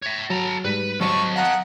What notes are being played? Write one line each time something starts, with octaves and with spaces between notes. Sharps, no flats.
C#5 E5
F#3 A4 A#5
G#2 G3 B4
F#3 A4 C5 C#5 D#5 C#6
F5 F#5 A#5 D#6